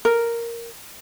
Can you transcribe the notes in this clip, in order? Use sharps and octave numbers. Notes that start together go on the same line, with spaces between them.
A#4